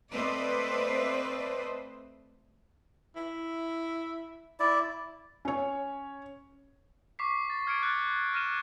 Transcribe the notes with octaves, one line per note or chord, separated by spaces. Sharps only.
A3 C4 B4 C5 D5 D#5
E4
E4 D5
C#4 C#5
C#6 D6 B6 C7
A6
F6 G#6 A6 C#7 D7
F#6 G#6 A6
F6 A#6 D#7 E7